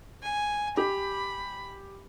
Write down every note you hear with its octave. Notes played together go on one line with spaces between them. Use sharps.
G#5
G4 B5